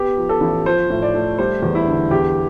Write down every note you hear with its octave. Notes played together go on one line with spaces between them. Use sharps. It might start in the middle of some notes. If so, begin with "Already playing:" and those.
Already playing: B3 G4
F3
A4
A1
F3 C5
A2
D5
A3
G3 C5
E2
E4
D3
E2 G4